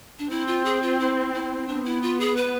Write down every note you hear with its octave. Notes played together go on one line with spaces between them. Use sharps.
D4
C4 E4
F4
G#4
F4
E4
E4
B3 D4
E4
F4
G#4
B4